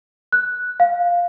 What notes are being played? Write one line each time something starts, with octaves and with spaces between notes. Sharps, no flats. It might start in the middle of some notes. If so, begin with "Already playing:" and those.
F#6
F5